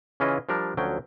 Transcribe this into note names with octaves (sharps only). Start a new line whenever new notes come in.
C#3 E3 C#4 E4 F4 D#5
F3 G3 D4 A#4
D2 F3 F#3 C#4 G5